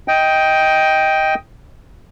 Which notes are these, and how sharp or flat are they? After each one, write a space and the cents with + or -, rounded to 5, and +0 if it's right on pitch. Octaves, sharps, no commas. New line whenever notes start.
D#5 +15 G5 +0